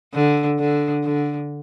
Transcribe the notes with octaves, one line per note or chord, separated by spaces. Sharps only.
D3
D3
D3